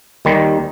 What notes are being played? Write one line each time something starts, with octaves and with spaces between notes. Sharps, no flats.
D#2 D#3 G3